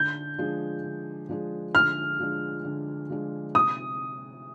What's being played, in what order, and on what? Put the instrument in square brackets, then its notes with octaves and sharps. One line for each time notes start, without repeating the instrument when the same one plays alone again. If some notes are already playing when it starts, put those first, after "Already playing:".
Already playing: [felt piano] D3 [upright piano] G6
[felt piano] F3 G#3 D4 G#4
D3
F3 G#3 D4 G#4
[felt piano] D3 [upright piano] F6
[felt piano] F3 G#3 D4 G#4
D3
F3 G#3 D4 G#4
[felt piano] C3 [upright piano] D#6